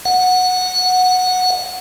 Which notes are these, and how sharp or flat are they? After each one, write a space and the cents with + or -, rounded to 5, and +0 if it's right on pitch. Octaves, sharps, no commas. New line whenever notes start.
F#5 -10